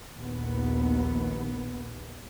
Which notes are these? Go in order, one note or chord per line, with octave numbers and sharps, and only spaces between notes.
A#1 D#2 B3